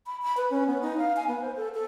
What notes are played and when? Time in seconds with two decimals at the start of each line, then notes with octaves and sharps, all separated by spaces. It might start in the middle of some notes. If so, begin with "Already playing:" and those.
0.07 B5
0.22 B5
0.37 B4
0.51 C#4
0.67 B3
0.82 D#4
0.98 F5
1.17 G#5
1.28 B3
1.41 C5
1.57 A4
1.74 A4